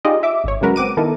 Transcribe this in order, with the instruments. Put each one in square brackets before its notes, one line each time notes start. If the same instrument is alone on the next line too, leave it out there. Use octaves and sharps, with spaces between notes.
[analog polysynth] D#4 F4 G4 G#4 D5 D#5
E5 D6
G#1 C#5
C#3 F#3 G#3 F#4 A#4 B4
C4 F#5 D6 D#7
D#3 B3 E4 A4 A#4